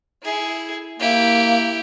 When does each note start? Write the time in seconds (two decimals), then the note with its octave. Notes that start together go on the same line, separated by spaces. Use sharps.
0.23 E4 G#4
1.00 A#3 E4 G4